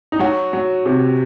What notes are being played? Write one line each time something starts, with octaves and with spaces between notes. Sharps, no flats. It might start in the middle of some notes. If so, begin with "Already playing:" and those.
D#4
F#3 F#4
F#3
C3